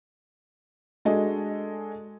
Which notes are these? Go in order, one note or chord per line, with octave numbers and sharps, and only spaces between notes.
G#3 D4 F#4 G#4 A4 D#5